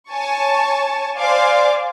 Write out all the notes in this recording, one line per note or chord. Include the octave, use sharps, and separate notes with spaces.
C#5 G#5 A5 C#6
C5 D5 F5 G#5 D6